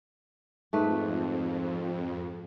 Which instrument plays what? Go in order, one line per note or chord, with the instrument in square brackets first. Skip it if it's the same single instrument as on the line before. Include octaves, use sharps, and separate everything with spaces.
[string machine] F2 [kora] G#2 A3 B4